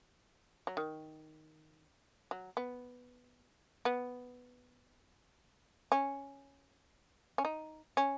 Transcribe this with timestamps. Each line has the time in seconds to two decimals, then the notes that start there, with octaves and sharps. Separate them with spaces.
0.67 F#3
0.77 D#3
2.31 F#3
2.57 B3
3.85 B3
5.92 C#4
7.38 C#4
7.45 D#4
7.97 C#4